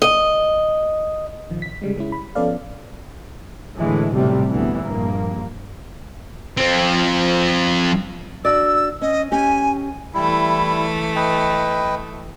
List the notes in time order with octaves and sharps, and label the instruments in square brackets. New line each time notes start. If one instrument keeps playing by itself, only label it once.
[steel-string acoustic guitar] D#5
[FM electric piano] A#1 D#3 F3
A1 B6
C#3 G3 G#3
C#3 G#3 C#4 E4
B5
F3 B3 C#4 A4 D5 F5
[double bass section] A2 D3 E3 G#3
B1 A2 C3 G3
D2 E3 B3
A#1 G2 A#3
[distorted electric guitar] F3 C4
[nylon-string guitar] D4 F#4 D5 [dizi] E6
[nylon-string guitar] C#4 [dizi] D#5
[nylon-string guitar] C#4 G4 [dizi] G#5
[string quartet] E3 A3 [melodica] G3 E4
[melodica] B4 D#5 G5